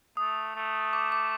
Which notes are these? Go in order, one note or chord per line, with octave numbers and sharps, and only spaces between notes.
A3 D#6
A3
D6
D6